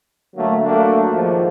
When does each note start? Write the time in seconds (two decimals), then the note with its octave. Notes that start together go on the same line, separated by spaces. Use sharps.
0.36 D3 F#3 A3 A#3
0.64 F#3 A3 A#3 D4
1.10 G#2 D#3 F3